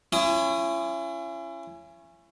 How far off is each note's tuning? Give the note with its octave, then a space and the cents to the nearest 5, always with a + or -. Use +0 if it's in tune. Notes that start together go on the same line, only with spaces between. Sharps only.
C#4 -10 E4 +40 D#6 +0